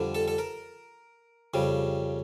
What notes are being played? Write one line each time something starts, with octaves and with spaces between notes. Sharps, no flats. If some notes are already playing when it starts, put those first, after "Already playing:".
Already playing: F2 D3 G3
A4
A4
A#4
F2 C#3 G3